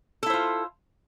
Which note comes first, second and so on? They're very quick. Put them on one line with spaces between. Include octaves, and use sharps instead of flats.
A4 E4 C5 F4